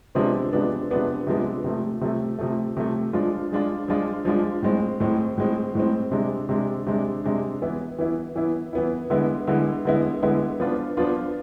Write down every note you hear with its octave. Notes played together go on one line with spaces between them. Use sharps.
C3 F3 G#3 B3 D4
C3 F3 G#3 B3 D4
C3 F3 G#3 B3 D4
C3 F3 G#3 B3 D4
C3 F3 A3
C3 F3 A3
C3 F3 A3
C3 F3 A3
F3 G#3 D4 F4
F3 G#3 D4 F4
F3 G#3 D4 F4
F3 G#3 D4 F4
A2 G#3 C4
A2 G#3 C4
A2 G#3 C4
A2 G#3 C4
C3 G#3 D4
C3 G#3 D4
C3 G#3 D4
C3 G#3 D4
E3 B3 E4
E3 B3 E4
E3 B3 E4
E3 B3 E4
D3 G#3 B3 E4
D3 G#3 B3 E4
D3 G#3 B3 E4
D3 G#3 B3 E4
F3 B3 D4 F4
F3 B3 D4 F4